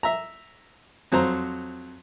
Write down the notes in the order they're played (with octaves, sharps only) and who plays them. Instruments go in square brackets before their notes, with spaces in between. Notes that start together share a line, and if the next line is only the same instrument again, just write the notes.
[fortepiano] E5 A#5
F2 F#3 C5 A#5